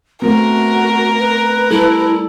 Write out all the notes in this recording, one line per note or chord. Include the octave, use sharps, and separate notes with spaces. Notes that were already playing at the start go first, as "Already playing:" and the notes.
A3 B3 C4 F#4 A#4
B4
G3 E4 A4